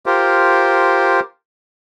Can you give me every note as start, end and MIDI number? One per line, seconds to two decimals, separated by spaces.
0.06 1.20 65
0.06 1.20 67
0.06 1.20 70
0.06 1.20 72